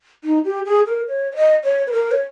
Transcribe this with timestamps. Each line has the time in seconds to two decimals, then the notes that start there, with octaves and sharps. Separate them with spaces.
0.24 D#4
0.45 G4
0.66 G#4
0.86 A#4
1.08 C#5
1.32 C#5
1.36 D#5
1.64 C#5
1.87 B4
1.92 A#4
2.11 C#5